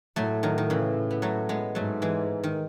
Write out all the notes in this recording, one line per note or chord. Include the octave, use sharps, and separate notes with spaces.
A2 F#3 A3
D#3 F#3
D#3
C#3 E3
B3
F#3 A3
G#3 B3
G#2 F#3 A3
E3 G#3
D#3